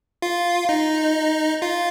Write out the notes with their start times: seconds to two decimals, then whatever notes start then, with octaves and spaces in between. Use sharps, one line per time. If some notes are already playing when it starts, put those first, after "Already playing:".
0.22 F4
0.69 D#4
1.62 F4